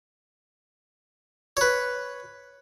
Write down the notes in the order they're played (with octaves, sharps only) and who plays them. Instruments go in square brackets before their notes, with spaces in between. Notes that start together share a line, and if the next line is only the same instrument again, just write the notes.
[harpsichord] B4 C#5